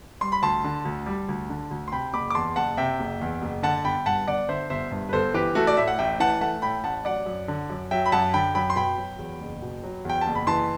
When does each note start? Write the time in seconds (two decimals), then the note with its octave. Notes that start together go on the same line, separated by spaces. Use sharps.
0.21 G3 C6
0.32 B5
0.42 D2 A5 C6
0.64 D3
0.85 D2
1.06 G3
1.28 D2
1.50 D3
1.71 D2
1.88 C6
1.92 C3 G5 B5
2.13 F#1 B5 D6
2.30 D6
2.35 E2 A5 C6
2.56 F#1 F#5 A5
2.77 C3 E5 G5
2.99 F#1
3.21 E2
3.42 F#1
3.63 D3 F#5 A5
3.84 G1 G5 B5
4.06 G2 F#5 A5
4.27 G1 D5 F#5
4.49 D3 C5 E5
4.70 G1 C5 E5
4.91 G2
5.09 B4
5.13 G1 A4 C5
5.34 E3 G4 B4
5.55 A3 F#4 A4
5.67 D5
5.77 A2 E5
5.88 F#5
5.99 A1 E5 G5
6.20 E3 F#5 A5
6.41 A3 F#5 A5
6.62 A2 G5 B5
6.84 A1 F#5 A5
7.05 F#3 D5 F#5
7.26 F#2
7.48 D3
7.70 F#2
7.91 F#3 E5 G5
8.06 B5
8.12 F#2 F#5 A5
8.33 D3 G5 B5
8.55 F#2 G5 B5
8.70 C6
8.76 B2 G5 B5
8.98 F#3
9.19 E2
9.40 F#1
9.62 B2
9.83 F#3
10.05 E2 G5
10.21 F#1 A5
10.35 B5
10.47 E3 A5 C6